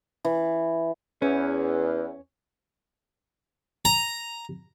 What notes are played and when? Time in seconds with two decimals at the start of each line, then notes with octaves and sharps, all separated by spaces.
0.25 E3
1.22 E2 C#4
3.85 A#5